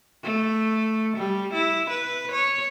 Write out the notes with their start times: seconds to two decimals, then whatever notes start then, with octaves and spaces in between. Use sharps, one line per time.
0.24 A3
1.17 G3
1.53 E4
1.90 B4
2.32 C#5